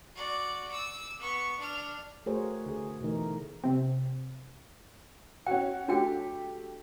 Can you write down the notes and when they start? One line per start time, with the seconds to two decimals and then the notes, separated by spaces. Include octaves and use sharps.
0.15 F#4 D5
0.67 D6 E6
1.19 B3 C#6
1.58 D4 F6
2.26 A3 F#4 G#4 A#4 C5 C#5
2.66 D3 G#4
3.01 B2 E3 A3 D#4 A#4
3.64 C3 C4
5.47 C#4 F#4 G5
5.88 A3 D4 F#4 G4 G5